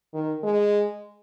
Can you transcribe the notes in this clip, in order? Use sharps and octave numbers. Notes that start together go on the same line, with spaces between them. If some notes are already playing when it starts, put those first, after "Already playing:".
D#3
G#3